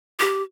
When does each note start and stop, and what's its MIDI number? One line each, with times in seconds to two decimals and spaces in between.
0.20 0.43 67